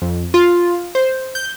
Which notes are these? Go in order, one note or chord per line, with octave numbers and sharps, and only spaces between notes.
F2
F4
C5
G6